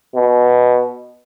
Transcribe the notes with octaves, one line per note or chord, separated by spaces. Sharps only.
B2